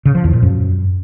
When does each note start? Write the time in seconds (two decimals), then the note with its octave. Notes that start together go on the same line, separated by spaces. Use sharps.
0.05 C#3
0.15 F3
0.24 E2
0.33 A#2
0.42 F#2